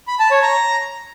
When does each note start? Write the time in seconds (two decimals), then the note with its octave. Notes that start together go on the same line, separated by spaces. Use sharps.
0.08 B5
0.19 A5
0.31 C#5
0.43 A#5